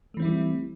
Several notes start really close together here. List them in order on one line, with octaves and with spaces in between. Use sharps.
A3 E3 C4 E4 G3